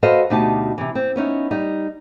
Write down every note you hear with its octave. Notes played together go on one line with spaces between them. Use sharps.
F#4 A4 B4 C5 D#5 F5
D2 B2 D#4 G4 A5
C3 E3
C4
B3 C#4 D#4 E4
G3 D#4